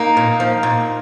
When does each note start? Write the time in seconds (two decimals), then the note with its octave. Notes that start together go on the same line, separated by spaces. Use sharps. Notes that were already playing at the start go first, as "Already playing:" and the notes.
Already playing: A#3 D#4
0.17 A#2
0.40 F3
0.63 A#2